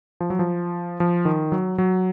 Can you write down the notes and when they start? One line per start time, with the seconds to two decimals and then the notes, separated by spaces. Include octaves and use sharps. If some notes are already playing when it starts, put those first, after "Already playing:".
0.20 F3
0.30 F#3
0.39 F3
1.00 F3
1.25 D#3
1.52 F#3
1.78 F#3